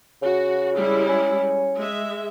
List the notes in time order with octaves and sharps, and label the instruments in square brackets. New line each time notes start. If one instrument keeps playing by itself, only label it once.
[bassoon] C#3 [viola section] F#4
[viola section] G3 G#3 E4
[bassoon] C#4
[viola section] G#3 E5